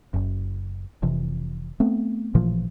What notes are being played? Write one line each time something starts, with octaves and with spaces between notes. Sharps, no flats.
F#1 F#2
F1 C3 E3
A3 B3 C4
A1 A#2 E3 F3